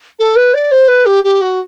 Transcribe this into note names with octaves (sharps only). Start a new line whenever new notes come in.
A4
B4
D5
C5
B4
G4
G4
F#4